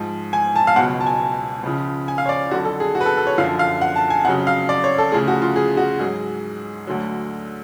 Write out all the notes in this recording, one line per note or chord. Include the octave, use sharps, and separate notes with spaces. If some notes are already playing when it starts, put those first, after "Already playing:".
Already playing: G#2 F3
G#5
A5
F5
C#2 B2 F#3 F#5
A5
G#5
C#2 C#3 F3
G#5
F5
C#5
D5
F2 D3 F#3 F#4
A4
G#4
F#4
B4
A4
A4
C#5
F#2 D3 F3 F5
F5
F#5
A5
G#5
F2 C#3 F#3 F#5
F5
D5
C#5
A4
D2 C#3 F3 G#4
F#4
F4
G#4
F#4
G#2 F#3 G#4
D2 D3 F#3